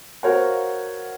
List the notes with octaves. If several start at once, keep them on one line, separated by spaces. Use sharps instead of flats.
F#4 A#4 C5 C#5 F5 F#5